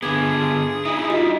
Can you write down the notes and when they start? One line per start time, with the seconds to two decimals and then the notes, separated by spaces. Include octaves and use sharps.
0.03 D3 B3 G#4 G#5 D6 G#6
0.85 D#4 E4 E5
1.10 G3 F4 F#4 D#5